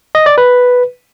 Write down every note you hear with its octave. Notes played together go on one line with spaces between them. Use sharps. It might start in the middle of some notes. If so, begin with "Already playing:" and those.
D#5
D5
B4